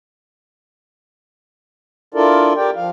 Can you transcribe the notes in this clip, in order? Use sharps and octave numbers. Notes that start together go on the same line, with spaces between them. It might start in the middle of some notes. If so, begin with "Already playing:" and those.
D4 E4 F4 A4 A#4 D5
G4 A#4 D5 G5
F3 F5